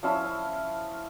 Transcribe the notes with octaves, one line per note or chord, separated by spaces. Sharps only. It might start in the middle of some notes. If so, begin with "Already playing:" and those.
F3 C#4 E4 E6